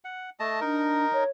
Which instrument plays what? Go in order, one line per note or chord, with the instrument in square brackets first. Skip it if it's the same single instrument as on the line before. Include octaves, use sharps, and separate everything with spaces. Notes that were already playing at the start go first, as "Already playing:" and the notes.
[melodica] F#5
A3 D#5 A5
[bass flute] D4 [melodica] D#4 A#4
[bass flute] C#5